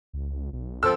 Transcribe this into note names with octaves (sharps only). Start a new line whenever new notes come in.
C#2
B1
C#2 F3 C4 A4 E6